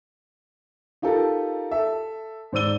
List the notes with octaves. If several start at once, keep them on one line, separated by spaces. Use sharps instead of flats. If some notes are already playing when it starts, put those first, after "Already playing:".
D#4 F4 G4 A4 A#4
A4 E5
G#2 C5 D5 E6 D#7 G7